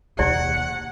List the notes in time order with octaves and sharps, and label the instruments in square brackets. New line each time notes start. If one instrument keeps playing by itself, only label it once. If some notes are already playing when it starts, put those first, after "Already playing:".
[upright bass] D#2 B2 [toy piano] E4 G4 D5 [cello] F#5